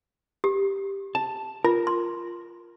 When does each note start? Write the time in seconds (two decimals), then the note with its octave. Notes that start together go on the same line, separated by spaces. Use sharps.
0.44 G4
1.15 A5
1.65 F4 A#4
1.87 C6